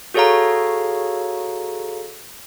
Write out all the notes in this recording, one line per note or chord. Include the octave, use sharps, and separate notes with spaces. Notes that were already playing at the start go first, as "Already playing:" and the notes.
F#4 G#4 A4 C#5 F5 A#5